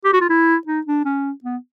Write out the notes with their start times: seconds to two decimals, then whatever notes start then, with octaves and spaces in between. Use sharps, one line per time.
0.04 G4
0.13 F#4
0.21 F4
0.29 E4
0.67 D#4
0.87 D4
1.05 C#4
1.44 B3